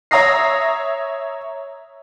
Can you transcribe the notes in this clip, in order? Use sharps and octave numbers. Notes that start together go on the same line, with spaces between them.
C#5 E5 A#5 D#6 A#6 C7